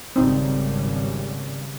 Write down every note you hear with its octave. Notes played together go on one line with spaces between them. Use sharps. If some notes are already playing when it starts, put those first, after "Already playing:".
G#1 C#3 G3 C4 D#4